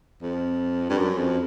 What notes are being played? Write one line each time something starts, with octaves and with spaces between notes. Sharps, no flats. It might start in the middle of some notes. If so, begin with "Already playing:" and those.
F2
G2
F#2
F2